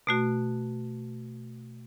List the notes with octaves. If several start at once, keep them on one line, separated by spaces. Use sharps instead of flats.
B2 A3 F#4